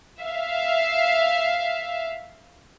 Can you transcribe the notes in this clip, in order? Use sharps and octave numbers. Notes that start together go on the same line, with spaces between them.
E5 F5